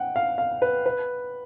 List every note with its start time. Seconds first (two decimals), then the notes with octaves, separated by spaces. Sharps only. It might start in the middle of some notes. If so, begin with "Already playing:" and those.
Already playing: F#5 G5
0.16 F5
0.38 F5
0.62 B4
0.86 B4